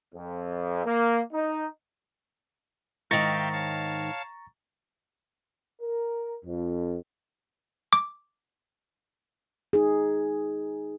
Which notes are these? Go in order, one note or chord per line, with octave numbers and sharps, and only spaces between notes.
F2
A#3
D#4
G#2 D#3 E5 F5 G5 A#5 C#6 A6
C#5 F5 A5
A#4
F2
D6
D#4 G#4